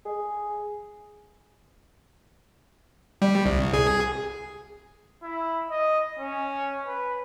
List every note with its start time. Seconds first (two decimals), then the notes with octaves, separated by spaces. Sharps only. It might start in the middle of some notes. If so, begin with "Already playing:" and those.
0.05 G#4
3.22 G3
3.45 C2
3.74 G#4
5.23 E4
5.70 D#5
6.19 C#4
6.85 B4